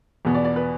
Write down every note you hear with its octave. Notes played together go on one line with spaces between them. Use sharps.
E2 B2 B3
D5
D5
B4